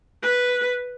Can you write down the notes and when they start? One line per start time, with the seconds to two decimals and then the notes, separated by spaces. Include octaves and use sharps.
0.22 B4